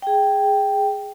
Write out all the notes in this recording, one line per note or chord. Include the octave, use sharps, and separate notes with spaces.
G#4 G5